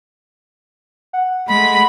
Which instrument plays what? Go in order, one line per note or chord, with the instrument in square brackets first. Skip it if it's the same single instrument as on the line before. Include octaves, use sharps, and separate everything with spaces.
[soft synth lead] F#5
[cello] G#3 A3 [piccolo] B5